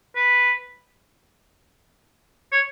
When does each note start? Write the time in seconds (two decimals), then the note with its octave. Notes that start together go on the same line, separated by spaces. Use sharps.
0.16 B4
2.52 C#5